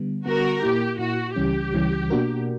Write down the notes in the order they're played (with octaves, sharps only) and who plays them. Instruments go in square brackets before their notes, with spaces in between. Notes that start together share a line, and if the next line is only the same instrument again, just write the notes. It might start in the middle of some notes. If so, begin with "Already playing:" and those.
Already playing: [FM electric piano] D3 G3 B3
[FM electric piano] D3 G3 B3 [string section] F#4 A#4
[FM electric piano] A#2 A#3 E4 [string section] G4
[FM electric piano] A#2 A#3 E4 [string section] F#4
[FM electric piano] C#2 C#3 E3 G3 C#4 [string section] G4
[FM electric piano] C#2 C#3 E3 G3 C#4
B2 A#3 D4 F#4 A#4